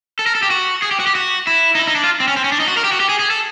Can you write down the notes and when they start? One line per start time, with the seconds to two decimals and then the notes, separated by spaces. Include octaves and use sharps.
0.19 A4
0.26 A#4
0.35 A4
0.43 G4
0.50 F#4
0.82 G#4
0.91 G4
1.00 F#4
1.07 G4
1.15 F#4
1.47 E4
1.75 D#4
1.79 E4
1.87 D#4
1.95 D4
2.04 F4
2.20 C4
2.28 C#4
2.37 C4
2.44 C#4
2.52 D4
2.60 D#4
2.68 F#4
2.77 A#4
2.84 G4
2.92 F#4
3.00 G4
3.09 G#4
3.19 G#4
3.30 A4